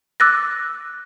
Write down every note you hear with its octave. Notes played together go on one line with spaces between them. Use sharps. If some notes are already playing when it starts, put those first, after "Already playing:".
D6 E6 F#6 A6 A#6